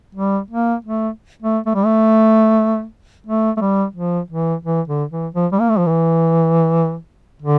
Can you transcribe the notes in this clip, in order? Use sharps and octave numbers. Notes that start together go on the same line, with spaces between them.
G3
A#3
A3
A3
A3
G3
A3
A3
A3
G3
F3
E3
E3
D3
E3
F3
G3
A#3
A3
F3
E3
D3